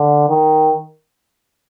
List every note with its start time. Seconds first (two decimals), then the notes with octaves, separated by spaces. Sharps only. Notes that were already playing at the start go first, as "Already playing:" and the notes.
Already playing: D3
0.29 D#3